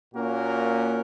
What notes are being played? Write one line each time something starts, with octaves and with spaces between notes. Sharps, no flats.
A#2 A#3 C#4 F#4 A#4